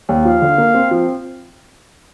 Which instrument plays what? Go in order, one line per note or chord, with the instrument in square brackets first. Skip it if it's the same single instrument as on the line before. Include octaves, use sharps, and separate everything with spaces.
[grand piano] D#2
[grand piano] F3 [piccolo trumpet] F5
[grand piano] D3
A#3
C4
F3